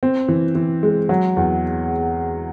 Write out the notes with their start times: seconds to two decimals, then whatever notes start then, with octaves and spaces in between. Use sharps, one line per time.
0.03 C4
0.29 E3
0.55 E3
0.83 G#3
1.09 F#3
1.37 E2